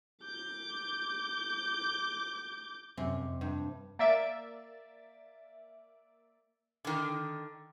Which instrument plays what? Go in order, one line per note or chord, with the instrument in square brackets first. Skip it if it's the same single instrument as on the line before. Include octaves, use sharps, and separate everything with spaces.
[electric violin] D6 G6
[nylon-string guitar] F#2 C#4 [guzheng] C3
[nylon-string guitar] F2
[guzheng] G2
[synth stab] A#3 D5 E5 A6 D7
[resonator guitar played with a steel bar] D3 D#3